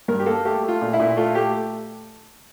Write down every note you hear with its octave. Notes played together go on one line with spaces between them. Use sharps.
G2 A#4
G4
A#3 A4
A3 G4
A3
F4
A#2
E4
A#2
A3 F4
A3 G4